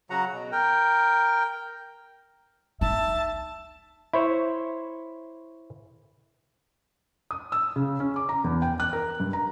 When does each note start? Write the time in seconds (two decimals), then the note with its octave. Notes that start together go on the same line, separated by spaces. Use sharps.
0.10 C#3 F#3 F#4 F#5 A#5
0.32 B2
0.52 A#4 G5
2.81 D#4 E5 A5
4.13 E4 C5 C#5
7.31 D#6
7.52 E6
7.76 C#3
8.00 C#4
8.16 D6
8.29 A#5
8.44 E2
8.62 G5
8.80 F#6
8.93 A#4
9.20 G2
9.33 A#5